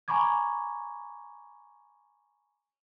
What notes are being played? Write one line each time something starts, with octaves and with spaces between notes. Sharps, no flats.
G#5 A#5 B5 C#6 D6 G#6